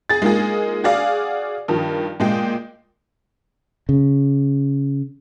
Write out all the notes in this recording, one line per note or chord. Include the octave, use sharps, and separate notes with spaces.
G#4 A6
G#3 A#3 D#4 F4 G#4
F#4 G#4 D5 F5
G2 D#3 F3
A#2 G#3 G5
C#3